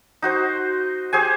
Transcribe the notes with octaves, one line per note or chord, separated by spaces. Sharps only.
D#4 F#4 C5
G4 G#4 C5 G#5